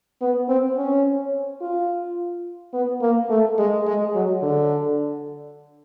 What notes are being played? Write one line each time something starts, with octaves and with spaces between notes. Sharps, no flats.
B3
C4
C#4
F4
B3
A#3
A3
G#3
G#3
F#3
D3